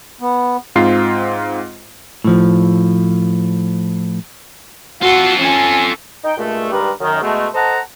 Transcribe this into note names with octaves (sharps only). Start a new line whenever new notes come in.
B3
G#2 C4 F4 C7
A2 F3
F4 F#4 A4
C#4 G#5
D#4 G5
G2 A#2 G#3 A3
G2 D#3 G3 G#3 A#4 B4
F#2 D#3
B2 G#3 A3
A4 C5 D#5 F#5 A5 A#5